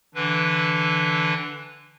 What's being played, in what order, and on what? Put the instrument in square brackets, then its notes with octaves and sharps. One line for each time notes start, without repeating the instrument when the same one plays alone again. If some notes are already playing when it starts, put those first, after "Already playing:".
[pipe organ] D3 E3 D4 B4